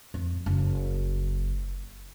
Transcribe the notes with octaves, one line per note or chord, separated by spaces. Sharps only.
F2
F#1